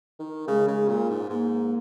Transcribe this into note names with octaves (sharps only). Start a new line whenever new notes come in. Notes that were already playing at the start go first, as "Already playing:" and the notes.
D#3
C#3 G#3
C#3
A#2
G#2
G#2 A#3